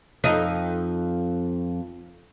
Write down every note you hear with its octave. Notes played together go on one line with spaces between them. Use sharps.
F2 D#4